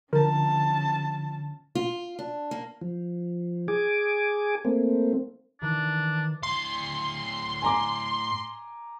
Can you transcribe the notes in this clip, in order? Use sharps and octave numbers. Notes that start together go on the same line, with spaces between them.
D3 F3 C#4 A#4 A5
F4
D4
A#3
F3
G#4 G#5 D6
A3 A#3 C4
D#3 E3 D4
A2 F5 C6
G#5 A#5 D6